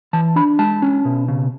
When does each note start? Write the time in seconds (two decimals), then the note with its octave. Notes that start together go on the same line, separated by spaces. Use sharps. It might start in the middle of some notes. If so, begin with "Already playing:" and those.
0.13 E3 A5
0.36 D4 B5
0.59 G#3 A5
0.82 C#4
1.05 B2
1.28 C#3